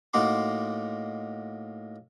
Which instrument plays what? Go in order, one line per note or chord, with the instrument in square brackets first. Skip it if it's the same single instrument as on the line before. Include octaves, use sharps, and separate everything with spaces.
[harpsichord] A2 A#3 D#4 F#4 C6 D6